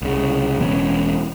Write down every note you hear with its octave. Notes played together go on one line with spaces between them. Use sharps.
C2 C#3
E1 B2 C4 C#4